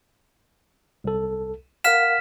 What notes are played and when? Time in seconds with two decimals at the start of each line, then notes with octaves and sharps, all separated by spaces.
1.04 C2 A4
1.84 A#4 F5 F#5 F6 B6 E7